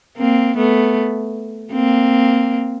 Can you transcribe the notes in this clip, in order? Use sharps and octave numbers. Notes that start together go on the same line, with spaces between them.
A#3 C4
A3 B3
A#3 C4